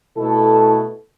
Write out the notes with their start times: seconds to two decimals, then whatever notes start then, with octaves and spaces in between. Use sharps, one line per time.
0.15 B2 A3 E4 A4